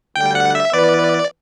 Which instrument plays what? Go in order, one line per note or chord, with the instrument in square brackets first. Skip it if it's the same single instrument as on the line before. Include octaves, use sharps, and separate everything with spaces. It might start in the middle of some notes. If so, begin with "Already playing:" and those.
[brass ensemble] D2 D3 G3 [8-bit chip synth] G5
[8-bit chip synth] F#5
E5
[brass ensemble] E3 B3 E4 B4 [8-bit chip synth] D5